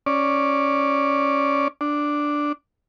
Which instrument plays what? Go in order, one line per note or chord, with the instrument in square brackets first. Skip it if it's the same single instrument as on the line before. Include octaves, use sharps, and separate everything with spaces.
[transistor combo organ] C#4 D5
D4